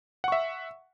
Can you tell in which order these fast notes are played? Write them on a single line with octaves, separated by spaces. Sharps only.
F#5 C#6 E5